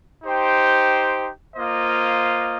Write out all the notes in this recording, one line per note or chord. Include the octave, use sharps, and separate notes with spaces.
D#4 G4 C5 G5
A#3 F4 C5 D#5